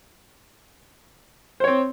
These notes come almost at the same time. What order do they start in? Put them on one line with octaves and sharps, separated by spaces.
C5 C#5 C4